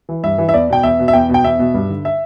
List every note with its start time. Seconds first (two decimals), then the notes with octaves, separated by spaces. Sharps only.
0.09 E3
0.24 G2 E5
0.38 E3
0.49 E5
0.54 E2 D5
0.69 B2 G5
0.83 E2 E5
0.99 B2
1.08 E5
1.13 E2 G5
1.29 B2
1.34 G5
1.44 E2 E5
1.59 B2
1.74 G2
1.89 D3
2.05 E5